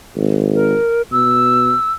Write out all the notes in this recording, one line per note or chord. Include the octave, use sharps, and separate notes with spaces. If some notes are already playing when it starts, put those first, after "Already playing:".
G#1
A#4
B2 E6